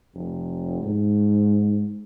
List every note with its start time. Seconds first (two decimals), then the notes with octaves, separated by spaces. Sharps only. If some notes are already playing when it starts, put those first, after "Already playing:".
0.15 F1
0.83 G#2